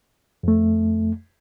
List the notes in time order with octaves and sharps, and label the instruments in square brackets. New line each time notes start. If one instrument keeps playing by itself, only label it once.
[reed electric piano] F2 A3